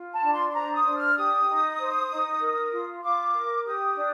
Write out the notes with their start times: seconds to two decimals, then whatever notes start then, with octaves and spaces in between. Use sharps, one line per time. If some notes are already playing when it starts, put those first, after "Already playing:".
Already playing: F4
0.12 A5
0.22 D4
0.32 C6
0.49 C6
0.54 C5 A#5
0.74 D#6
0.85 D4
0.95 F6
1.16 G4 D#6
1.48 D#4
1.78 C5
2.10 D#4
2.40 A#4
2.71 F4
3.03 F4 D6
3.34 A#4
3.65 G4 D#6
3.96 D4